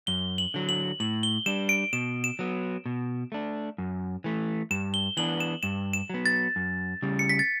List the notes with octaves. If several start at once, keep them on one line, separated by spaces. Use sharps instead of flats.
F#2 G7
F#7
D3 F#3
F#7
A2 F#7
G7
G3 D4 E7
D7
B2 E7
E7
F#3 B3
B2
A3 D4
F#2
E3 A3
G2 E7
G7
E3 B3 D4 F#7
E7
G2 E7
E7
F#3 B3
A6
F#2
C#3 G3
C#7
B6
A6